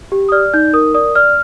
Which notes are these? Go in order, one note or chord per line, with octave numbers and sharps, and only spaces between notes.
G4
D#6
D5 F6
D#4 G6
A#4 D#6
D5 D#6
D5 F6